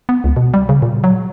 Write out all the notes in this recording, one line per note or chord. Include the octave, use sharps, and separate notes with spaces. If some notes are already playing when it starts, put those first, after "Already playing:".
B3
C#2
B2
G3
C#3
A#2
F#3